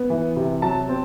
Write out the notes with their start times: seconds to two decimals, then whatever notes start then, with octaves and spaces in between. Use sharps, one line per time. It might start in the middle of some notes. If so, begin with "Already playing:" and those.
Already playing: B3
0.10 E3
0.36 C3
0.62 F#3 A5
0.89 C4